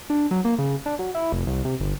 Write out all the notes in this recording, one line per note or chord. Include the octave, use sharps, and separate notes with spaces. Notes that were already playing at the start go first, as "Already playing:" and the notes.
D4
F#3
A#3
C#3
D4
F#3
E4
F1
C2
C3
G1